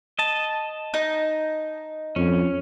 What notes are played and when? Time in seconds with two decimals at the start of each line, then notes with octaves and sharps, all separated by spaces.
0.19 D#5 A5
0.94 D#4
2.16 F2 C#4